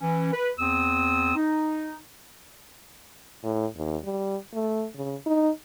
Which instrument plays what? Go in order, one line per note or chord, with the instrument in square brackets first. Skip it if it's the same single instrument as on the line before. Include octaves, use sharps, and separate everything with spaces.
[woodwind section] E3 C#4
B4
E2 C4 D#6 E6
D#4
[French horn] A2
D#2
G3
A3
C#3
D#4